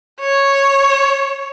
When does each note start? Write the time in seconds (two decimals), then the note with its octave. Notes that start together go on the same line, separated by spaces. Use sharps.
0.20 C#5